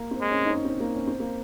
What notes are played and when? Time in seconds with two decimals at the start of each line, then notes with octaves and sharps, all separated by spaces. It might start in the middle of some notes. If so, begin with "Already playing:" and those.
Already playing: A#3
0.11 C4
0.21 G#3
0.31 C#4
0.45 D#4
0.50 C#4
0.65 C4
0.80 A#3
0.95 C#4
1.07 C4
1.20 A#3